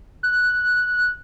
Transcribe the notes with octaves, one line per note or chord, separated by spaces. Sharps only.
F#6